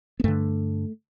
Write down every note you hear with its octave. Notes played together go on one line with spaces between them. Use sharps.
B3
G2 D3 A3